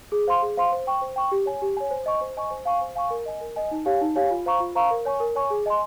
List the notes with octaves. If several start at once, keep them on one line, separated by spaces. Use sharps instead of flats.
G#4
C5 F5 C6
G#4
C5 F5 C6
C5
G5 C#6
C5
G5 C#6
G4
C#5 G#5
G4
C#5 G#5
C5
D#5 G#5 C#6
C5
D#5 G#5 C#6
C5
F5 G#5 C#6
C5
F5 G#5 C#6
A#4
D#5 G#5
A#4
D#5 G#5
D#4
G4 C#5 F5 G#5
D#4
G4 C#5 F5 G#5
F4
C5 F5 A#5 C#6
F4
C5 F5 A#5 C#6
A#4
C#5 G#5 C#6
A#4
C#5 G#5 C#6
G#4
D#5 G#5 C6